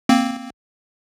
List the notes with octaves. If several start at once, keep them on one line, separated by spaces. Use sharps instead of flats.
A#3 C4